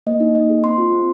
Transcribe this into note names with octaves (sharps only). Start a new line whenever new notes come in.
A#3 D#5
D#4
A#3 D#5
G#4
C4 C6
F4
C4